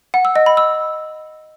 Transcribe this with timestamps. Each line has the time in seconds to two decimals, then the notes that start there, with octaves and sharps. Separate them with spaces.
0.14 F#5
0.25 E6
0.36 D#5
0.46 B5
0.57 E6